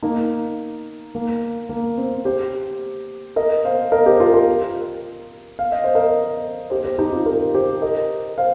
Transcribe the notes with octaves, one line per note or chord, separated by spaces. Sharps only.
A#3 D#4
A#3
A#3
C4
G4 C5
A#4 D#5
C5 F5
A#4 D#5
G4 C5
F4 A#4
F4 A#4
F5
D#5
C5
A#4 D#5
G4 C5
G4 C5
D#4 G4
C4 F4
F4 A#4
G4 C5
A#4 D#5
C5 F5